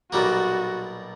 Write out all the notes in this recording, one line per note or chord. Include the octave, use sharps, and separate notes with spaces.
B1 A#2 G3 A#3 F#4